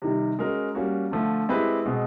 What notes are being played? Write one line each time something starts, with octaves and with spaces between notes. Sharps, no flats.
C3 D#3 G3
G#3 C#4 F#4 A#4
G3 A#3 C#4 F#4
D3 F3 A3
G#3 C4 E4 G4 B4
B2 G#3 C4